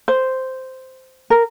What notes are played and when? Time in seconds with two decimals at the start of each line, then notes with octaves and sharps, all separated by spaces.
0.08 C5
1.30 A#4